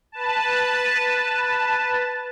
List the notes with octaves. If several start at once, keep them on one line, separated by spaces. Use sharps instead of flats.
B4 A5